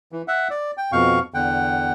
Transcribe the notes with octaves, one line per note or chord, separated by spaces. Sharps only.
E3
E5 F#5
D5
G5
F2 B2 F5 C#6
E2 D3 F#5 G5